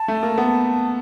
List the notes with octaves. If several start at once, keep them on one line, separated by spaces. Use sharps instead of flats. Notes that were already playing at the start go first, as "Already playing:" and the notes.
Already playing: A5
A3
A#3
B3